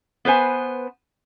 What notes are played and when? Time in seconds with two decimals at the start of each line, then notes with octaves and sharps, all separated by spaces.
0.25 B3 B4 C5 G#5